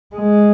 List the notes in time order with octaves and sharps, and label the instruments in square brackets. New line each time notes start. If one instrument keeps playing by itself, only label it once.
[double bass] G#3